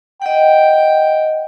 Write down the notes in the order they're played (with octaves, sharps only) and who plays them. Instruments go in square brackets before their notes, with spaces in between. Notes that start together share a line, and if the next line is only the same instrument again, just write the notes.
[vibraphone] D#5 F#5 [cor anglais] G5